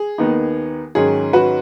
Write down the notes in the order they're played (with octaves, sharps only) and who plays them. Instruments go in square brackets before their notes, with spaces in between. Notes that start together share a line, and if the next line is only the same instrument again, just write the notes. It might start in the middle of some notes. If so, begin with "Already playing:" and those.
Already playing: [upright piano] G#4
D#2 D#3 B3 D#4
G#2 D#3 F#3 C#4 G#4
F#4 B4